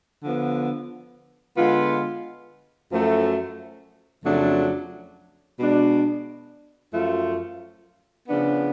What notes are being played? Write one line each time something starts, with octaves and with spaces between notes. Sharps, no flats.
D3 F3 B3
D3 G#3 B3 F4
F#2 F3 A3
F2 C#3 F#3 A3 D4
B2 G#3 D4
F#2 F3 A3 F4
C#3 F3 B3 D4